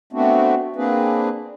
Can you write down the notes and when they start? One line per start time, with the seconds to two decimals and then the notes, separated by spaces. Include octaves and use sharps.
0.13 A3 B3 C4 D4 F#4
0.76 A#3 C4 D4 G#4 B4